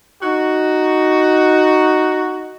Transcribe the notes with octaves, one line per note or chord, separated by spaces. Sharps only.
D#4 F#4